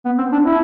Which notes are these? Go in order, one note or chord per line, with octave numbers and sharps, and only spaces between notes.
B3
C4
D4
E4